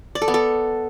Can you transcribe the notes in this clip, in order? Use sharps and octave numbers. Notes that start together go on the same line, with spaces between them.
D5
A4
B3
A4